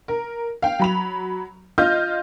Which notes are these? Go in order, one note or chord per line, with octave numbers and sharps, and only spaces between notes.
A#4
F5 G5
F#3 B5 F7
F4 D#5 F6 G6